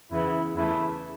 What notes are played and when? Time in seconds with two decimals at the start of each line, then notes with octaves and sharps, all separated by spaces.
0.11 E2 C#3 E3 B3 E4
0.56 E2 C#3 E3 A3 E4